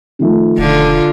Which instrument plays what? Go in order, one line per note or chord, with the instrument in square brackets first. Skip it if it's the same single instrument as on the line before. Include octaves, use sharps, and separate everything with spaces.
[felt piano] D#3 F3 A3
[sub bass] E1 [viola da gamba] D3 F4